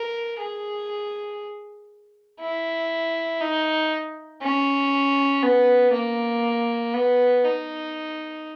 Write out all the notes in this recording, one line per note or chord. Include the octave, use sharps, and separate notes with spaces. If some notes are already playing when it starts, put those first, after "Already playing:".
Already playing: A#4
G#4
E4
D#4
C#4
B3
A#3
B3
D#4